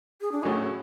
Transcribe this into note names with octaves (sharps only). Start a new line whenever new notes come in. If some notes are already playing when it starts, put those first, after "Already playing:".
G#4
D4
A2 F#3 A3 C#4 F#4 G#4